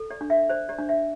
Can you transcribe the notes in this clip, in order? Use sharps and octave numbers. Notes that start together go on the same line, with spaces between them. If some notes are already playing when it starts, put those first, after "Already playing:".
Already playing: A4
D5
D4
E5
C5 D5
D5
D4
E5